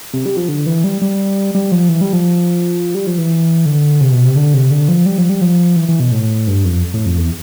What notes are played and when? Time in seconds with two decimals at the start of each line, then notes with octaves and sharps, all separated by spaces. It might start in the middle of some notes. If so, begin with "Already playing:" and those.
0.13 C3
0.26 G3
0.37 F3
0.49 D3
0.66 E3
0.84 G3
1.02 G3
1.55 G3
1.72 F3
1.89 E3
2.01 G3
2.13 F3
2.95 G3
3.07 F3
3.18 E3
3.66 D3
4.01 C3
4.12 B2
4.24 C3
4.36 D3
4.54 C3
4.71 D3
4.88 F3
5.06 G3
5.18 F3
5.30 G3
5.41 F3
5.76 E3
5.89 E3
6.00 B2
6.11 A2
6.47 G2
6.65 F2
6.94 A2
7.06 F2
7.18 E2